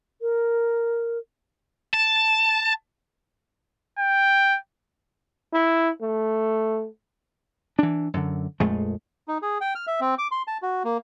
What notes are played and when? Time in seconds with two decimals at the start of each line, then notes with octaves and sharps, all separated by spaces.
0.21 A#4
1.93 A5
3.99 G5
5.53 E4
6.01 A3
7.79 E3 D4
8.14 F#2 D3
8.60 A#1 F2 G#3 A3
9.28 D#4
9.42 G#4
9.61 G5
9.75 F6
9.87 E5
10.01 C4
10.18 D6
10.31 C6
10.47 A5
10.62 F#4
10.84 A#3